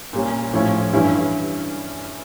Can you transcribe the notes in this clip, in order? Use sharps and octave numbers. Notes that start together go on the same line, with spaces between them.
A#2 G3 C#4
A2 F3 C#4 E4
G2 E3 G3 C#4 E4